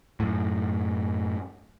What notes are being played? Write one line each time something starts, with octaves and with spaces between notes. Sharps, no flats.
F#2 A2